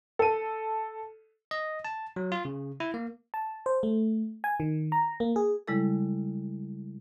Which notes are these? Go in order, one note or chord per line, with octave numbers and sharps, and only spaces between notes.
A4 D#7
D#5
A5
F#3
F4
C#3
E4
A#3
A5
C5
A3
G#5
D#3
A#5
A#3
G#4
C#3 G3 G#3 E4 A4